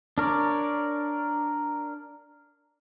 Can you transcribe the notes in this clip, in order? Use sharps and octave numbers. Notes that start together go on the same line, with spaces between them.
D4 A#4 C#5 D5